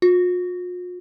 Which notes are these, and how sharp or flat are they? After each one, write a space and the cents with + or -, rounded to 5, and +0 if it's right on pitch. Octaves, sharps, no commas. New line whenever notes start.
F4 +45